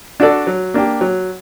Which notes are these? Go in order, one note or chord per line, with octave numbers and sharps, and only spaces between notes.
D4 F#4 A4 D5
F#3
A#3 D4 G4
F#3